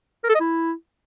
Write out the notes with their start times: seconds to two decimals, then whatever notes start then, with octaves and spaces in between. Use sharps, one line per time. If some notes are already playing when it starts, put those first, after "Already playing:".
0.24 A#4
0.29 A4
0.35 D#5
0.40 E4